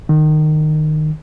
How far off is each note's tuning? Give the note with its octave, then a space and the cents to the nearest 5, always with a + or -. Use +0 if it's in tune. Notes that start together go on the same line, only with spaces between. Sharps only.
D#3 -20